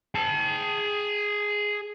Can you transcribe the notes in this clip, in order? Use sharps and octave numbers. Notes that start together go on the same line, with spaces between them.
G#4 A5